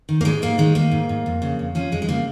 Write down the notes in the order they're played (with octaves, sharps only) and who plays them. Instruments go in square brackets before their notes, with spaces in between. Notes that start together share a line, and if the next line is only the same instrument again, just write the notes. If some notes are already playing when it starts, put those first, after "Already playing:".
[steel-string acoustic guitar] D#3
A#3
G#2 G#3
G#2 A#3
D#3 G#3
D#3 A#3
G#2
G#2
F2
C#3
F2
F3 C#4
F2 G#3
G#3
C#3 A#3